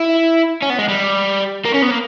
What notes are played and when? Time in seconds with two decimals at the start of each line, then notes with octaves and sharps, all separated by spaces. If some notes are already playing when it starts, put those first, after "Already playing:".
Already playing: E4
0.62 C#4
0.70 B3
0.79 G#3
0.88 G3
1.65 A#3
1.74 C#4
1.83 B3
1.92 A#3